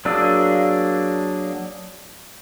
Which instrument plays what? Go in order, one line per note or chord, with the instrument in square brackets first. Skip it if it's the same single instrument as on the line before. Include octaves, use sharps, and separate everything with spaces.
[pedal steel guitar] F#3 A#3 D4 G#4 E6